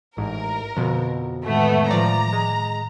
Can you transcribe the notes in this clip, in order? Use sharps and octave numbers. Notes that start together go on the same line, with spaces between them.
A1 G#2 A#4
F2 B2 D3
A2 D#3 G#3 A3 B3
A2 F3 D5 A#5
G#3